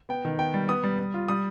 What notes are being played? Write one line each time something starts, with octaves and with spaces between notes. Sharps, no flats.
B3 G5
D#3
B3 G5
G3
B3 D#6
G3
G3
F4
G3 D#6